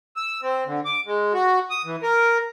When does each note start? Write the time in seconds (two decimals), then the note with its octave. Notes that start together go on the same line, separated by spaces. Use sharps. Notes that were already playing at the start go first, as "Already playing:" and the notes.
0.16 E6
0.42 C4
0.66 D3
0.85 D6
1.06 G#3
1.33 F#4
1.70 D#6
1.85 E3
2.03 A#4